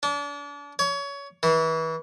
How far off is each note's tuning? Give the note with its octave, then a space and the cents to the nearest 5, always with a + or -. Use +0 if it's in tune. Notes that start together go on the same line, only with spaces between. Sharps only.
D4 -35
C#5 +25
E3 -30